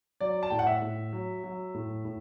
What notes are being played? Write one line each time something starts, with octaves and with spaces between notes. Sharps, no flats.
F#3 D5
A5
A2 G5
F#5
E5
A2
F#3
F#3
A2
A2